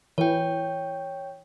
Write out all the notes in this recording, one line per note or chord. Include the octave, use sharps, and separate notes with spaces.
E3 C#5 G5